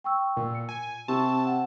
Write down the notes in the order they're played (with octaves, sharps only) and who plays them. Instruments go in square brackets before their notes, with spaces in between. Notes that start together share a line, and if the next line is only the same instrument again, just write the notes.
[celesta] G5 C#6 E6
[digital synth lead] A#2
[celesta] C#7
[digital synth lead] G#5
[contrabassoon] C3 [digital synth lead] A5 [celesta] C6 C#6 E6
[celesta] F#5